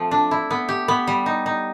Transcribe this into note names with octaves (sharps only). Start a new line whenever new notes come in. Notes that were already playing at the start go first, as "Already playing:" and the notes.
Already playing: F3 A3 C4
D4
E4
B3
G4
B3
G3
D#4
D#4